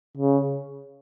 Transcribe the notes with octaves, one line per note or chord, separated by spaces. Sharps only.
C#3